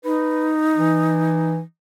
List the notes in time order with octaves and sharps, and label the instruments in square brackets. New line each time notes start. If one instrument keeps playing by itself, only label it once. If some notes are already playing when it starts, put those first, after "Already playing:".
[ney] D#4 [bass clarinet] B4
[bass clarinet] E3